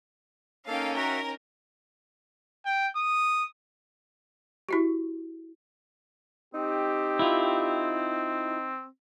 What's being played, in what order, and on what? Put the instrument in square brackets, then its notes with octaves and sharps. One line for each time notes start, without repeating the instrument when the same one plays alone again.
[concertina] A#3 A4 [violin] C#4 D#4 [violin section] F5 G5
[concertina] F#4 E5 F#5 [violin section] A#4
[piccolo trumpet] G5
D#6
[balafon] E4 F#4 G4
[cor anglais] C4 [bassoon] D#4 [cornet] G4
[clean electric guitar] E4 F4